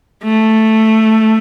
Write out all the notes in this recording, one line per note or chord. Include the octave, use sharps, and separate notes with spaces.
A3